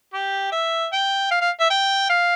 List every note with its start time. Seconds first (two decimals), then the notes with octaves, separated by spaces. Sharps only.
0.14 G4
0.52 E5
0.92 G5
1.31 F5
1.41 F5
1.60 E5
1.70 G5
2.10 F5